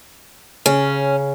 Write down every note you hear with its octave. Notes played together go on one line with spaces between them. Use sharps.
C#3 C#4